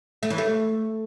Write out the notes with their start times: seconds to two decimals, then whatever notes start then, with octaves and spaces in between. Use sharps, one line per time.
0.23 A3
0.30 E3
0.38 A3